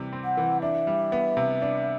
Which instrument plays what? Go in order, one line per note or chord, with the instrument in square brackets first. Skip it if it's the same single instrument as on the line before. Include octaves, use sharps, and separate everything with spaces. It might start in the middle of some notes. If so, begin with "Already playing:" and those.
Already playing: [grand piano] C3 E3 G3
C4
[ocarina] F#5
[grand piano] E3
[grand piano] D4 [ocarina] E5
[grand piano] G3
B3
C3
D4